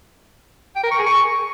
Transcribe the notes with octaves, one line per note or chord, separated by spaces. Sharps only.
G5
A#4
C#6
G#4
C#6